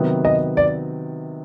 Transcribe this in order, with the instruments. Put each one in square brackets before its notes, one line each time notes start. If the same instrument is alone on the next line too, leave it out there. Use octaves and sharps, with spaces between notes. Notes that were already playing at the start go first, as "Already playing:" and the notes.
Already playing: [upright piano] C3 D#3 F#3 B3
[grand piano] D#5
D5